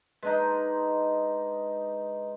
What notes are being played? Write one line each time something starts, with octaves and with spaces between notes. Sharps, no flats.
G#3 D4 D#4 B4 D#5 A#5